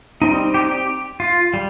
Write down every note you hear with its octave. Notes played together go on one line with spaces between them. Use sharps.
G3 C4 D#4
G4
G4
F4
G3